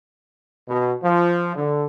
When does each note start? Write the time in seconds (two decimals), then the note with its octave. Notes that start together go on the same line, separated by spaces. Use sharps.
0.69 B2
1.03 F3
1.56 D3